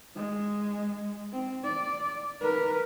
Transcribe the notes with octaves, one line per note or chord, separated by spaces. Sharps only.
G#3
C4
D5
A#4 B4